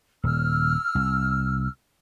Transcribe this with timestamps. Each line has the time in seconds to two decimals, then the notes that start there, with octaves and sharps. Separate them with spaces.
0.24 D#1 E6 F6
0.95 C2